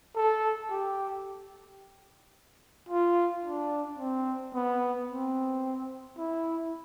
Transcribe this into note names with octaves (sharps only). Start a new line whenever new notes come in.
A4
G4
F4
D4
C4
B3
C4
E4